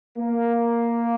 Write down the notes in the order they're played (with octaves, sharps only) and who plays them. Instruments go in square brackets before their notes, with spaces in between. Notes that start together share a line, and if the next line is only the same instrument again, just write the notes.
[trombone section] A#3